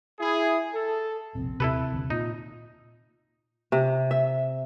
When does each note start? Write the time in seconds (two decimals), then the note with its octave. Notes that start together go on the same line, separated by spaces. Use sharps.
0.19 E4 G#4
0.73 A4
1.35 E1 A#1 C3 C4
1.60 D#1 C3 E4 A4 B4
1.92 D#1 D#2 D3
2.10 A#2 D#4 F4
3.72 C3
4.11 E5